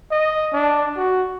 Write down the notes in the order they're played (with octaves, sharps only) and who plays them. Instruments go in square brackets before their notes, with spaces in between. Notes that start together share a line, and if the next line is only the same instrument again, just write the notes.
[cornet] D#5
D4
F#4